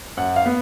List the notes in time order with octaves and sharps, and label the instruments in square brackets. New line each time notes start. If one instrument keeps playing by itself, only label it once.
[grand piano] F#2 F#5
F5
B3